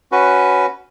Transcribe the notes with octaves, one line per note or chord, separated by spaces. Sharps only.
C#4 F#4 B4